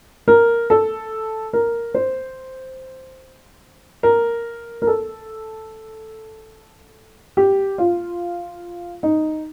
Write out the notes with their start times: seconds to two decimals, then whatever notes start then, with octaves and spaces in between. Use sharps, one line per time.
0.28 A#4
0.70 A4
1.53 A#4
1.94 C5
4.03 A#4
4.82 A#4
4.87 A4
7.37 G4
7.78 F4
9.03 D#4